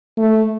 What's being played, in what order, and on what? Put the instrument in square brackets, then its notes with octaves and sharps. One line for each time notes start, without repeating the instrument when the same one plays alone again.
[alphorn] A3